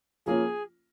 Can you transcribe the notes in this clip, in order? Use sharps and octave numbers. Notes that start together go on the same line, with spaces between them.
F3 A#3 C#4 F4 G#4